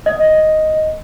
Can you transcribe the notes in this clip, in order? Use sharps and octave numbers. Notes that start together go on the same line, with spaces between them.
D#5